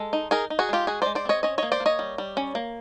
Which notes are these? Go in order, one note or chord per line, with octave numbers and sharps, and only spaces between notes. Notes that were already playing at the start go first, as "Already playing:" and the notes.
Already playing: G#3 A4
D#4
D#4 G#4 A#4
D#4
F#4 G#4
G#3 F4 G4
G#3 F#4 G#4
G#3 C5 D5
C5 D5
C4 C#5 D#5
C#4 C#5 D#5
A#3 C#5 D#5
C5 D5
A#3
C#5 D#5
G3
G3
C#4
A#3